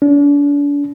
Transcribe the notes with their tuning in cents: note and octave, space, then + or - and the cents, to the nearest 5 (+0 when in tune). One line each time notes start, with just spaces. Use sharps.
D4 -40